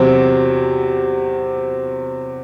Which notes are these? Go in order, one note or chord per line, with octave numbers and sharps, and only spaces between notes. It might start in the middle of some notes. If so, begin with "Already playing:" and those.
Already playing: E2 C3 F#3 C4